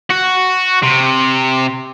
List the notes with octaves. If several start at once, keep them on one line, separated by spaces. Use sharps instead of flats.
F#4
C3